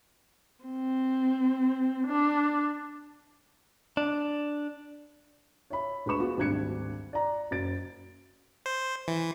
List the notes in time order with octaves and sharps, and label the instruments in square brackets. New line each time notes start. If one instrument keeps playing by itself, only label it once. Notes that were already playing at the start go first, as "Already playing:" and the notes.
[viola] C4
D4
[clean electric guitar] D4
[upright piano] C#5 E5 B5
D2 G#3 B4 B5 C#6 E7
B3 F4 F#4 G#4
G#1 D2 G2 F#6 G#6 C#7
D5 A#5
F#1 F#3 A6 D7
[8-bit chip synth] C5
E3